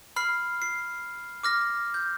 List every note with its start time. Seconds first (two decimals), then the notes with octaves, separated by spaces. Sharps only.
0.16 B5 F6 C7
0.62 C7
1.43 D6 F6 A#6
1.94 G6